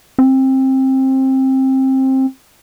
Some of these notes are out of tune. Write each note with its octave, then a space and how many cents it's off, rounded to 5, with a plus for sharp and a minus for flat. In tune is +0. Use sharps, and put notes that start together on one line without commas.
C4 +20